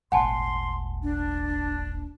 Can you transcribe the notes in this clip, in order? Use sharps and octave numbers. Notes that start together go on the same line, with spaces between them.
D#1 G#1 F#5 G#5 A5 C6
D4